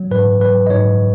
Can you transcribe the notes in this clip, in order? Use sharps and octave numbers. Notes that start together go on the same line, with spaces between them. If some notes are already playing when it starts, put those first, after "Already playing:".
Already playing: F#3
G#2 B4
F#3 B4
D#5
G#2 C#5